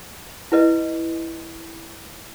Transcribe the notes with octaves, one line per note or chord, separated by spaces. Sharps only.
E4 B4 D#5